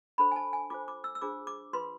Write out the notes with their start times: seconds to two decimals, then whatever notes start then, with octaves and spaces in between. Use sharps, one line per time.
0.18 D4 A4 C5 B5
0.32 G#5
0.36 A5
0.53 G#5
0.70 F4 A4 C5 D6
0.88 D6
1.04 E6
1.15 E6
1.22 D4 F4 G#4 C5 D6
1.47 D6
1.73 F4 B4 C6